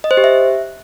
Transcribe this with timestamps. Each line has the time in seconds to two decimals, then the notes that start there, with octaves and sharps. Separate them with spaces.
0.04 D#5
0.11 C5
0.17 G4
0.24 E5